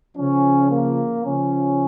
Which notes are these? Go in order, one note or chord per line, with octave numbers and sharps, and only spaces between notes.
C#3 F3 C#4
A#3
C#3 F3 C#4